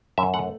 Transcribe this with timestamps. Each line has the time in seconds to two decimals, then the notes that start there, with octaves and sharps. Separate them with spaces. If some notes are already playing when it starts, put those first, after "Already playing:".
0.18 F#2 E5
0.34 A3 F#5